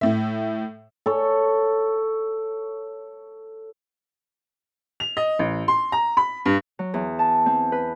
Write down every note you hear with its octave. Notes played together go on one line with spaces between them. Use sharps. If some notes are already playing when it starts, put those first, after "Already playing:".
A2 E5
A4 C#5
F7
D#5
A1
C6
A#5
B5
G2
F#3
E2
A5
C4
B4